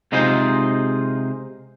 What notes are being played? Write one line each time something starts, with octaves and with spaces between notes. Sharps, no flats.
C3 G#3 D#4 F4 G#4 C5